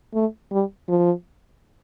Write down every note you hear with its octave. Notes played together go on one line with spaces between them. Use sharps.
A3
G3
F3